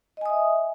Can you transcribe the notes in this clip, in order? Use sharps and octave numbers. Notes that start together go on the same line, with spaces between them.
D#5 E5 G#5 D#6